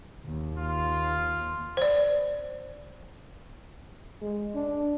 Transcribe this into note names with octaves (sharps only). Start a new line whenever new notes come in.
D#2
F4
C5 D5
G#3
D4